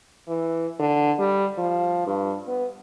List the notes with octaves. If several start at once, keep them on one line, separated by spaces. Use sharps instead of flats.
E3
D3
G3
F3
G2
B3